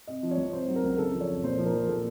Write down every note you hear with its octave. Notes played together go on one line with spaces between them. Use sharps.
C3 D#5
F3
C#5
C2
C3 C5
F#3
A#4
C#2
C#3 A4
F3
C#5
F2
A#2 C5
F3
A#4
A#1
A#2 A4